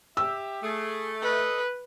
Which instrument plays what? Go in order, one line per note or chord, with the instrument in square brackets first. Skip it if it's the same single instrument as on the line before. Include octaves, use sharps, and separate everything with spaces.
[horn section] G4 E5 [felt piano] E6
[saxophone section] A3 [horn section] G#4
[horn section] A4 D#5 [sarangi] B4